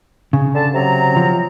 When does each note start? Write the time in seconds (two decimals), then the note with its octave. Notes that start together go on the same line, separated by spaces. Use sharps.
0.33 C#3
0.55 D3 A5
0.74 C3 F#3 A#5
1.17 F3